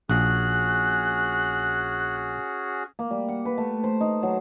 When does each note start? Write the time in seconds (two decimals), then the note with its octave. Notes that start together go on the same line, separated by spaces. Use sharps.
0.09 A#1 C#4 F#4 G#4 F#6
2.99 A#3
3.11 G3
3.28 F#5
3.45 B4
3.58 A3
3.84 C5
4.01 D#4
4.23 F#3